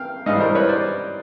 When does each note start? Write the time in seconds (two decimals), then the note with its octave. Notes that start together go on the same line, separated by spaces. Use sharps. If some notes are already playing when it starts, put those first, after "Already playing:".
Already playing: F5 G5
0.26 G#2 E3 G3 D#5 F5
0.40 A#4 C5
0.55 B4 C#5
0.69 C5 D5